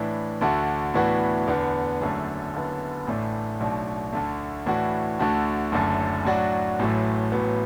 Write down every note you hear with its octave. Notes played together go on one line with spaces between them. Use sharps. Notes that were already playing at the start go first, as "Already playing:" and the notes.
Already playing: A2 E3 D4
D2 D3 A3 F#4
A2 E3 B3 D4 F#4
E2 D3 B3
F#1 F#2 D3 A3
F#1 F#2 D3 B3
A1 A2 A3 D4
B1 B2 A3 D4
D2 D3 A3
A2 E3 D4 F#4
D2 D3 A3 F#4
F#1 F#2 D3 A3
A2 F#3 D4 F#4
A1 A2 F#3 A3
A1 A2 F#3 B3